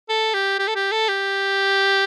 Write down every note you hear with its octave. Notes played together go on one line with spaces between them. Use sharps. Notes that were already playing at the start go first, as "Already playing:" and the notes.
A4
G4
G4
A4
G4
A4
G4